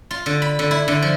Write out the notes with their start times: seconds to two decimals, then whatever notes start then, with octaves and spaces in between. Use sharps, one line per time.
0.11 F4
0.26 D3
0.42 B5
0.59 D3
0.71 E4
0.88 D3
1.02 F3